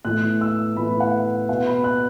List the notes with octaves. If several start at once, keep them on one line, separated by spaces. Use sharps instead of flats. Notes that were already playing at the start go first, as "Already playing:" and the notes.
A2 E3 B3 F#6
E6
A2 E3 B3 B5
F#5
B2 B3 F#5
B5
F#6